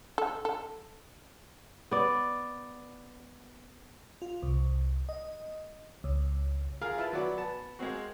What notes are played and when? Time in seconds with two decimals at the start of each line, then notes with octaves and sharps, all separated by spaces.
0.18 A4
0.45 A4
1.91 B3 D5
4.22 F4
4.43 C2
5.09 D#5
6.04 C#2
6.81 F4 G#4 A#4 F5
6.98 E4 F4 B4 A5
7.13 F#3 B3 F#4 D5
7.38 B3 A5
7.79 G#3 A#3 C4 F#4